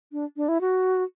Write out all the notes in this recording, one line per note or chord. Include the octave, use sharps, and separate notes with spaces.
D4
D4
E4
F#4